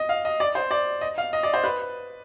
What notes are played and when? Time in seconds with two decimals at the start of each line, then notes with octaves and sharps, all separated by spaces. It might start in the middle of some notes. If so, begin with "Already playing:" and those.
Already playing: D#5
0.09 F5
0.25 D#5
0.40 D5
0.55 C5
0.71 D5
1.01 D#5
1.18 F5
1.33 D#5
1.43 D5
1.54 C5
1.64 B4